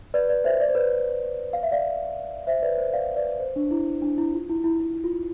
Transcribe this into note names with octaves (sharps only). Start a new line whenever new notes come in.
B4 D5
B4 D5
C5 E5
D5
C5
B4 D5
F5
E5
D5 F5
C5 E5
B4 D5
C5
D5 F5
B4 D5
C5
D4
E4
D4
E4
F4
E4
E4
E4
F4